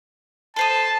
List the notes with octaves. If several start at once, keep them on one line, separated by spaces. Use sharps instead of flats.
A4 C5 A5 D#6